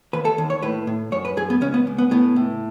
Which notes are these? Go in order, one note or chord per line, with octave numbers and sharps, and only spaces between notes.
D#2 B4
A4
D#2
C#5
A2 B4
A2
F#2 C#5
B4
F#2 G#4
B3
C#2 C#4
B3
C#2
B3
A2 B3
A2